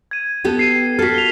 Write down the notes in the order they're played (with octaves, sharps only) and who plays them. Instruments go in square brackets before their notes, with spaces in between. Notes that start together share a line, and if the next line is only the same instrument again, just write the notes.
[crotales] G#6 D#7
[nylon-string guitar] B3 G4 A4
[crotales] C7 D#7
[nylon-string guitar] F#4 A4 [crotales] F6 B6
[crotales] F7 G7